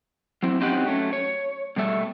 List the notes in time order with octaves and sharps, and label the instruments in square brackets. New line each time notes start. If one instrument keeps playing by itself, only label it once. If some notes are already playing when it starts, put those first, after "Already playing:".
[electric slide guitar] F#3 C4 E4
C4 C#4 D#4 G4 F#5 G5
F#3 A3 C#4
C#5
B2 G3 A3 E5